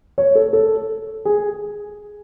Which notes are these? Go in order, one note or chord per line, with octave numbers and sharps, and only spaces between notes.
C#5
A4
A4
G#4